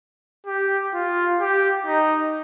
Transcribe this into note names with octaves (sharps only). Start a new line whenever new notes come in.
G4
F4
G4
D#4